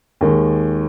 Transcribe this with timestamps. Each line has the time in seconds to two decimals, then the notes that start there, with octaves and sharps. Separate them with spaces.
0.21 D#2 D#3 G#3